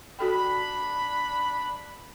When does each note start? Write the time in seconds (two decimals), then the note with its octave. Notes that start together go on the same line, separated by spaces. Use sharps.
0.19 D4 F#4 A4 G5 B5